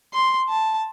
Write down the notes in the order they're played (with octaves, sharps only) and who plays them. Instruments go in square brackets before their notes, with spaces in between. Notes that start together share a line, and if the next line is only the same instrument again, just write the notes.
[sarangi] C6
A5